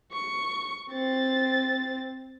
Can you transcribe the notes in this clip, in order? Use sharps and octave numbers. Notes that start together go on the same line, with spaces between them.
C#6
C4 A6